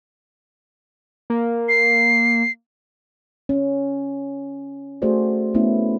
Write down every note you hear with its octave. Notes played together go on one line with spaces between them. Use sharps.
A#3
C7
C#4
A3 F#4 G#4 A4 C5 D5
A3 B3 C#4 E4